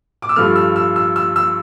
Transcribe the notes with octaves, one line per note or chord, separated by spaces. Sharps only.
D6
E6
G2 F3 A3 F6
E6
E6
E6
E6
E6